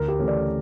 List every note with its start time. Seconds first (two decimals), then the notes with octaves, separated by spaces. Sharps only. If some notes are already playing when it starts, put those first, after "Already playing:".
Already playing: D2 A#4
0.08 G4
0.19 C#3 E3 A3 C#4
0.28 D5